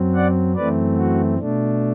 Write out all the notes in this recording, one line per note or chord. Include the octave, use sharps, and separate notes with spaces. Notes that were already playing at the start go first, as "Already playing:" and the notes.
Already playing: F#2 F#3 C4
D5 F#5
F#2 E3 A3 C4 B4 D5
F#4
B2 A3 D4